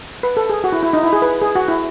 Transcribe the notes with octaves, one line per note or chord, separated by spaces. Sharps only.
B4
A4
G#4
F#4
E4
E4
D#4
E4
G#4
B4
G#4
F#4
E4